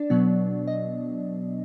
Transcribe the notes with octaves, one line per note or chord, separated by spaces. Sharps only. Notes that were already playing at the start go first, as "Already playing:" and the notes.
Already playing: D4 D5
B2 F#3 B3
D#5